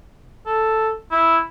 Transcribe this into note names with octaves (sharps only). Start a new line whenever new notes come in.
A4
E4